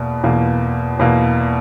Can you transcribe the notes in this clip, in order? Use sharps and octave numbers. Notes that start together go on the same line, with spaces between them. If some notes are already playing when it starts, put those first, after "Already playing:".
Already playing: E2 B2 A#3
E2 B2 A#3
E2 B2 A#3